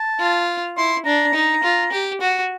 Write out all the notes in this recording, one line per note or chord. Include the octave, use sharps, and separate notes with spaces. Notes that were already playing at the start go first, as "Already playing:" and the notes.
Already playing: A5
F4
E4 C6
D4 A#5
D#4
F4
G4
F#4